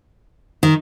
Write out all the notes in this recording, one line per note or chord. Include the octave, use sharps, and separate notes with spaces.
D#3